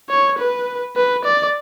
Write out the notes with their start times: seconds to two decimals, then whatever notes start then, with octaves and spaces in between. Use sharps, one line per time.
0.10 C#5
0.38 B4
0.96 B4
1.25 D5